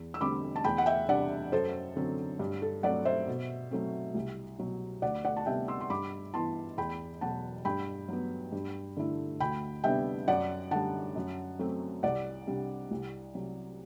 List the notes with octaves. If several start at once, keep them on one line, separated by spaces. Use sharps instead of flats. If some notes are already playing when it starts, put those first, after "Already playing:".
Already playing: E2
E6
D3 G3 C4 B5 D6
A5
E2 G5 B5
F#5
E5 G5
C3 G3 D4 D5 F#5
F#2 A4 C5
D3 F#3 C4
G2
A4
F#3 A3 C4 D5 F#5
C5 E5
B2
F#3 A3 C4
C2
B2 F#3
D2 D5 F#5
D5 F#5
A5
C3 G3 B3 E5 G5
C6 E6
C6
G2 B5 D6
E3 B3 E4 A5 C6
E2 G5 B5
B2 F#3 F#5 A5
G2 G5 B5
F#3 B3
G2
D3 A3 E4
D2 G5 B5
C3 G3 B3 D4 E5 G5
F#2 D5 F#5
D3 G3 F#5 A5
F#2
F#3 A3 C4
C2 D5 F#5
C3 G3 D4
C2
C3 F#3